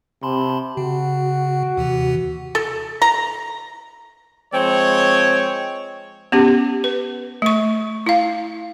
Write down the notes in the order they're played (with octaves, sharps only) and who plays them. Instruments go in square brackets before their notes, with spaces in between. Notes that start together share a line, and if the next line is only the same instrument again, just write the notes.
[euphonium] C3 [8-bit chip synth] A5 B5 C6
[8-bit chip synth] C#3 [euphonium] F#4
[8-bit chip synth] D#2 C3 E3
[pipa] A4
A#5
[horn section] F3 G#3 C4 C#5
[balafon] B3 C#4 G4
B4
A3 C#6
E4 F5